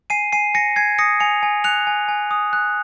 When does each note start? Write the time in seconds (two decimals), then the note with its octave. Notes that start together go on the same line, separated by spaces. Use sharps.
0.10 G#5 C7 D#7
0.33 G#5 C7 D#7
0.54 G#5 A#6 C#7
0.76 G#5 G#6 C7
0.99 D#6 A#6 C#7
1.20 G#5 C#7 F7
1.43 G#5
1.64 F#6 C#7 F7
1.87 G#5
2.08 G#5
2.31 D#6
2.53 F#6